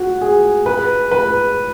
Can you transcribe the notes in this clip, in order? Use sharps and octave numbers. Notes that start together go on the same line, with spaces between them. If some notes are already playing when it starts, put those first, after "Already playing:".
Already playing: F#4
G#4
B4
B4